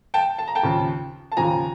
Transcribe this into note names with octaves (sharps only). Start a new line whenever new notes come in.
G5 A5
A5
A#5
G5 A5
D#2 C#3 F3
A5
D#2 C#3 F3 G#5 A#5